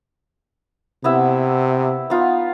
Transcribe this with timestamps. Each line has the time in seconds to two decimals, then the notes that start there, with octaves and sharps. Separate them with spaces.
1.04 C3 B3 E4 E5
2.10 B3 D#4 F4